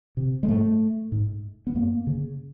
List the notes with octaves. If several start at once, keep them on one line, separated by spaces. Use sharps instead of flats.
C3
G#3
G#2 A3
G#2
B3
F#2 A#3
C#3